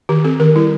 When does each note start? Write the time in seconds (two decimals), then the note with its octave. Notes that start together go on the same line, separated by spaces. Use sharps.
0.09 D#3 G4
0.25 C4 A4
0.40 D#3 A#4
0.55 G3 E4